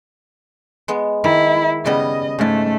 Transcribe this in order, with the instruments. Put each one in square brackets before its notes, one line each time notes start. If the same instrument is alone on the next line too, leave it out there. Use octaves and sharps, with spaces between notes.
[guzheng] G#3 B3
[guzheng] D#3 [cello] E4
[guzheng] C#3 G3 B3 [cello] D#5
[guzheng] G#2 C#3 [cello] A3